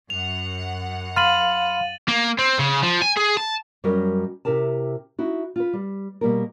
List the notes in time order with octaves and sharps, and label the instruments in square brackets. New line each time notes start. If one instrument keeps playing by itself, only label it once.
[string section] F#2 F#5 [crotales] F7
[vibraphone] F5 [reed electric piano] B5 C6 F6 [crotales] A6 D#7 F#7
[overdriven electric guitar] A#3
C4
C#3
F3
G#5
G#4
A5
[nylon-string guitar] F#2 F#3 G3 F#4 A#4 D#5
C3 E4 G4 A#4 A5
D#4 E4 F#4
F4 B4
G3
B2 G3 A#3 A#4